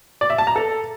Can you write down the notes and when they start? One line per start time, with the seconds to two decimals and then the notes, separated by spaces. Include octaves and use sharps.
0.21 D5
0.30 E5
0.38 A5
0.47 A#5
0.56 A4